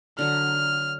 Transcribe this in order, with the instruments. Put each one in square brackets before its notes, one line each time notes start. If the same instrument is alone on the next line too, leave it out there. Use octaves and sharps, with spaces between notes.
[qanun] D3 F#3 A#5 [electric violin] F6